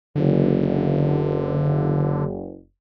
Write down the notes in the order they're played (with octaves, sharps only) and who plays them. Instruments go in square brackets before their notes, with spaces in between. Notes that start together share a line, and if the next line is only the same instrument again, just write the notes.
[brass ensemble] F#1 [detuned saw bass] D3